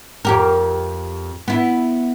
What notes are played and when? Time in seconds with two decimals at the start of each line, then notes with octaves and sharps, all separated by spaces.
0.25 F2 G4 A#4
1.48 B3 E4